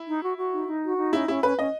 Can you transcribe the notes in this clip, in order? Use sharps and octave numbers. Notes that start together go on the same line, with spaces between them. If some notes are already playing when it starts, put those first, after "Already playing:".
Already playing: E4
D#4
F#4
F#4
D#4
D#4
F#4
D#4
C#4 E4
C#4 E4
C#4 B4
C#4 D#5